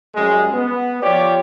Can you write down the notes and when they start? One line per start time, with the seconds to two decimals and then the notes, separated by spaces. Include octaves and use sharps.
0.15 F#2 G3 G#3
0.54 B3
1.02 F3 F4 G4 C#5 D5